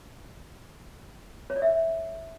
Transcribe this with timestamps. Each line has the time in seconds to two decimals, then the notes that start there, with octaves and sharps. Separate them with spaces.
1.50 C#5
1.56 D5
1.62 E5